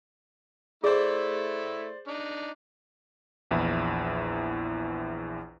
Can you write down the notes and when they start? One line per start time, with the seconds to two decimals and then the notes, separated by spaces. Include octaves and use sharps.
0.84 A3 E4 G#4 C5 D5
2.08 D4 D#4
3.51 A#1 E2 E4